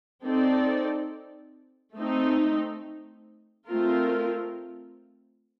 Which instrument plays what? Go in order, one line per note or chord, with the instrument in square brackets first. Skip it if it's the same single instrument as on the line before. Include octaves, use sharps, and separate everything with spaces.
[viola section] C4 D#4 A4 D5
A3 C4 D#4
A3 C4 F4 A#4